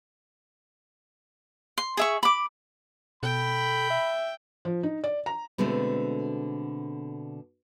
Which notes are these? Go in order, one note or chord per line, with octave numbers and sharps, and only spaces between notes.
C6
G#4 E5 C#6
B5 D6
B2 A4 G5 B5
E5
F3
D#4
D5
A#5
B2 D3 G#3 A3 C4